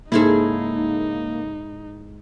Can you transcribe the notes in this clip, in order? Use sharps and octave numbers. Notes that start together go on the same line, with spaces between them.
G#2 C#3 A#3 D#4 E4 G#4 A4